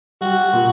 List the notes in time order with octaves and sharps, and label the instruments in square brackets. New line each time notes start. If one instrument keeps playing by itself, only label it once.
[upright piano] G3 [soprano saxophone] F#4
[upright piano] A#2